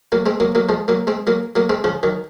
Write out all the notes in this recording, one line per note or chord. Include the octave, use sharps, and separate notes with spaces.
F#3 A#3
G#3 C4
F#3 A#3
F#3 A#3
F3 G#3
F#3 A#3
G#3 C4
F#3 A#3
F#3 A#3
G#3 C4
C#3 F3
D#3 F#3